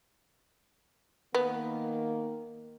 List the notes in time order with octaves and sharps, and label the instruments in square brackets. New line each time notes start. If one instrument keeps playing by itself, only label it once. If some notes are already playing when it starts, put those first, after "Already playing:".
[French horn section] D#3 A#3 [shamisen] B3